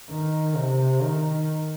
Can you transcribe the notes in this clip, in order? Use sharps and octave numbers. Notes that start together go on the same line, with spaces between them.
D#3
C3
D#3